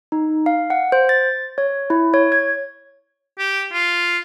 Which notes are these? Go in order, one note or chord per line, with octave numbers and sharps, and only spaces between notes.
D#4
F5
F#5
C5
A6
C#5
E4
C#5
G#6
G4
F4